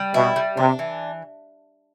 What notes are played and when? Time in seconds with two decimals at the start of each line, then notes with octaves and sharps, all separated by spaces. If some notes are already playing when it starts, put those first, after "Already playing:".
Already playing: G3
0.14 B2 E4
0.36 G3
0.57 C3 D4
0.79 E3